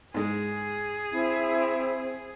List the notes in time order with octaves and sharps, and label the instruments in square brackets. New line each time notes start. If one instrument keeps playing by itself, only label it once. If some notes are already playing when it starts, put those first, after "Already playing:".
[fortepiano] G#2 G#3 [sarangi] G#4
[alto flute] C4 [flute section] E4